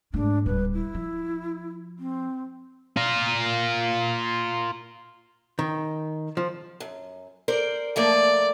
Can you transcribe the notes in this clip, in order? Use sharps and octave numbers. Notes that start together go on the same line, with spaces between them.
G#2 A3 D4
D1 G3 B4
E4
F3
C4
F4 A#4
D#3
F3
F#2
A#4 C5 D5
F3 A3 A#3 D5